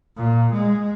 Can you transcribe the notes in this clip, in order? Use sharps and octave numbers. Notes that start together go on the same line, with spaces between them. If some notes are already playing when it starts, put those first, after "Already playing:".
A#2
G#3